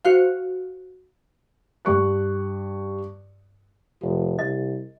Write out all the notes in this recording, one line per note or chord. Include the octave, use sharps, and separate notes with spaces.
F#4 C5 F5
G2 C#6 F#6
F1
C2 D#5